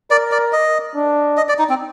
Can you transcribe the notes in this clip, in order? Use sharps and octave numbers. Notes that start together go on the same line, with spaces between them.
A#4 D5
D5
D#5
D4
D#5
D5
D#4
C4